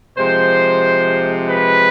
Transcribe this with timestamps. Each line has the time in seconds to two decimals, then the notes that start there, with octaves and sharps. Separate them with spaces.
0.18 C3 F3 G#3 C5
1.48 B4